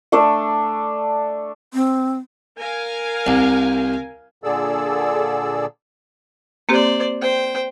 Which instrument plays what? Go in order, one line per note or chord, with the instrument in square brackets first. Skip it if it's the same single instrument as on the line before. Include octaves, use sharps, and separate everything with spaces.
[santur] A3 D4 A4 D5
[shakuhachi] C4
[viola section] A#4 F5 G#5
[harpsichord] C2
[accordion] A#2 D3 G#4 A4 D5 E6
[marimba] A#3 C4 G4 [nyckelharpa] C5 D5
[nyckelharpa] C5 G5